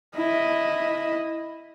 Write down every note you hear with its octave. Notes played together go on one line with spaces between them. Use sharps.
E4 D#5